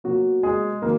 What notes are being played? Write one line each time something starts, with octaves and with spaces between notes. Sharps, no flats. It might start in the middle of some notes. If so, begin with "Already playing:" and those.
B2 F#3 A#3 F#4
G#3 G#4
D#3 F#3 A#3 A#4